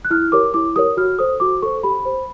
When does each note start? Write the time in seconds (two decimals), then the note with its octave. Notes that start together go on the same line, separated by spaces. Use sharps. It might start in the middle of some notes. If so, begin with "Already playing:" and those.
0.05 F#6
0.11 E4 F6
0.32 G4 A#4 C#5 D6
0.54 E4 D6
0.76 G4 A#4 C#5 D#6
0.97 F#4 F6
1.18 A4 C5 D#6
1.40 F#4 D6
1.62 A4 C5 C#6
1.83 G4 B5
2.05 C5